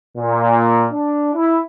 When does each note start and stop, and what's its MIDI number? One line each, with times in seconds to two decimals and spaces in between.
0.18 0.88 46
0.92 1.32 62
1.34 1.58 64